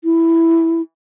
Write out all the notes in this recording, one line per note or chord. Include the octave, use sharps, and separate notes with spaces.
E4